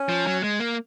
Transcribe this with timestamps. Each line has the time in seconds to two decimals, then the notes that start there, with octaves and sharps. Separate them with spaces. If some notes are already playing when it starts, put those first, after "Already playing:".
Already playing: C#4
0.09 F3
0.27 F#3
0.43 G#3
0.60 A#3